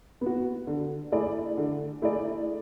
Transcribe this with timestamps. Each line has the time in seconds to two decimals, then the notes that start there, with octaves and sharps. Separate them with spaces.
0.21 B3
0.26 F#4
0.67 D3
1.12 A3 E4 G#4 D5
1.57 D3
2.02 A3 E4 G#4 D5